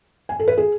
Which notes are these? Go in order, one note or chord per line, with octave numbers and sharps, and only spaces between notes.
G#5
A4
B4
G#4